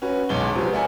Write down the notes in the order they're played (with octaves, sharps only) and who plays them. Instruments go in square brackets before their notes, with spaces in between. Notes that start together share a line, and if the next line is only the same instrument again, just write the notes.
[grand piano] C#4 F#4 B4
E1 B1 E2 G#3 G7
C3 F3 F#3 G#3 B3
A#4 D5 E5 F#5 G#5